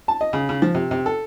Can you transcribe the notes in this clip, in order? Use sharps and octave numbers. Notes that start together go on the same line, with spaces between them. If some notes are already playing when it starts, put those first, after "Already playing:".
A5
D#5
C#3
C#3
F3
C3
C3
A4